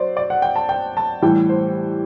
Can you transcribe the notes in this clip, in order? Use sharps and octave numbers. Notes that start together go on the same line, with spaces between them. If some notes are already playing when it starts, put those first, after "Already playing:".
Already playing: F#3 C5 D5
D5
F#5
G5
A5
G5
A5
A2 E3 G3 G5
C5